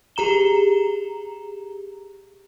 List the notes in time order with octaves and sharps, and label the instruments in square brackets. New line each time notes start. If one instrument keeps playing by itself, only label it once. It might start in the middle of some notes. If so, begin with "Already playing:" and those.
[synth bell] G4 G#4 A#5 E7 G7